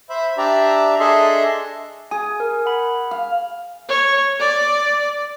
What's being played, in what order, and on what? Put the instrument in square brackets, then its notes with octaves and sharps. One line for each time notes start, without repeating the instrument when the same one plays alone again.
[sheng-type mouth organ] C5 E5 B5
D4 G4 D5 E5 A#5
D4 G#4 A4 D#5 E5 C6
[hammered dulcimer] G#4 [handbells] G#5
[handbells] A#4
F#5 B5
[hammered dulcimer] F5
[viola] C#5
D5